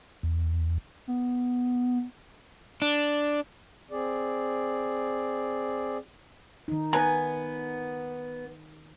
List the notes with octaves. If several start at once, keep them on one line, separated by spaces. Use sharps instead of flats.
E2
B3
D4
C4 G#4 D5
D#3 D#4
B3 B4 G#5 A#5